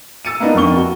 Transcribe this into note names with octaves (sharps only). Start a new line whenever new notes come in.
E6 A6 C#7 D#7
A#3 B3 D4 D#4 D#5
F2 A#4 C#6 G7
F#4